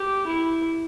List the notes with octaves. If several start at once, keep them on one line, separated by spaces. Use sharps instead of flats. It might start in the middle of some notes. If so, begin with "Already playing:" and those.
Already playing: G4
E4